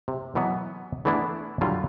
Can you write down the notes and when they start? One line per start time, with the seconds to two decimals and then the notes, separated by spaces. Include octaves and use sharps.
0.08 C3
0.35 B2 E3 F#3 B3
1.05 E3 A3 B3 D4 E4
1.61 D3 F#3 G3 E4 F4